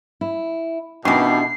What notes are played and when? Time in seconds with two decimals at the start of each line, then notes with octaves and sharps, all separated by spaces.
0.21 E4
1.05 B2 D#3 E3 C#4 D4 G4 A5 C7